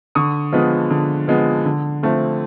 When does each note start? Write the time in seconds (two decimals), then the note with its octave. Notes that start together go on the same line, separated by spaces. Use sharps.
0.15 D3 C#6 D#6
0.52 F3 G#3 B3
0.91 D3
1.28 F3 G#3 B3
1.65 D3
2.03 F3 A3 C4